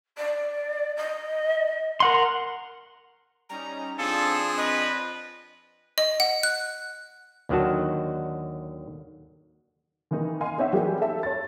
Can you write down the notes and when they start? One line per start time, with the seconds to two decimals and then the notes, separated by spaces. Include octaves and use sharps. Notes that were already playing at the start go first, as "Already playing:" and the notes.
0.17 D5
0.96 D#5
2.00 A#4 F#5 C6
3.49 G3 C#4 D#4 A#5
3.98 F3 C4 D4 G#4 A4 F5 E7
4.57 B4 D#5
5.98 D#5
6.20 F#5
6.43 F#6
7.49 D#2 D3 D#3 F#3 F#4 A5
10.11 D#3 E3 A#3 D#4
10.41 D#5 F5 G#5 C6
10.58 B3 D#4 C5 C#5 E5 F#5
10.73 E3 F#3 G3 A#3 G4 G#4
11.00 G4 A4 E5
11.23 C#5 A6